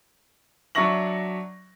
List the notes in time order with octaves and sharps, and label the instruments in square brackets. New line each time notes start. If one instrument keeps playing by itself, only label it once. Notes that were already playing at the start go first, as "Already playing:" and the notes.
[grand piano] F#3 D4 E5 C#6 A#6 F#7